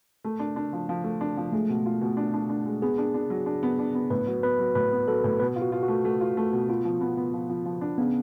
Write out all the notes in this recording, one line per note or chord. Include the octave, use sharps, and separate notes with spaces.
A3
D4
D4
F3
F3
A3
D4
F3
G#3 A3
B2
F4
B2
D4
D4
D4
G#3
B3 G#4
D4
D4
F#3
D4
B3
D4
B3
A2 B4
F#3
B3 B4
F#3
A2 B4
B3
F#3 A4
A2
B2 B4
F4
F#4
F4
F#4
A3
A3
F4
A3
B2
B3 F4
F3
B3
B3
F3
F3
F3
D4
C#3 B3